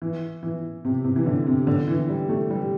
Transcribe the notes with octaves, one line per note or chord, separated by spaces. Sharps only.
E3
E3
C3
C3
E3
D3
C3
D3
E3
G3
A3
G3